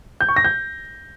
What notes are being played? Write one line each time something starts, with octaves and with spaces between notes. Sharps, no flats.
G6
C#6
A#6
G6